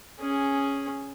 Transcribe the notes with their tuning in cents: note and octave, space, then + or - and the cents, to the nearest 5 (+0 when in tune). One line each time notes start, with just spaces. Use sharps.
C#4 +0 G#4 +0